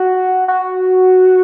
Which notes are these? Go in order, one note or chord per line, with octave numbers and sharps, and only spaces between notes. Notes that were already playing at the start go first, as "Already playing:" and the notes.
Already playing: F#4
F#4